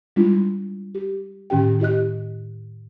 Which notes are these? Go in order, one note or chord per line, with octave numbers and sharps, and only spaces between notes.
G3 G#3 D4 E4 F4
G4
A2 D#3 C#4 G4 G5
E4 G4 D#5 F#6